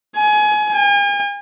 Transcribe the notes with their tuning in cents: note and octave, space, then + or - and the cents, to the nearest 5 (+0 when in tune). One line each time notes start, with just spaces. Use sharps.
G#5 +25
G#5 -40